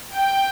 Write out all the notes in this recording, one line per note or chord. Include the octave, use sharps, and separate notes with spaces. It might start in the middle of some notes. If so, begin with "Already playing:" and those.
G5